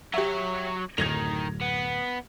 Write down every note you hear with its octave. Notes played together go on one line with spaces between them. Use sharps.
F#3 G4 C#5 E5
D1 F#2 A2 D#3 G#6 A#6 F7
B3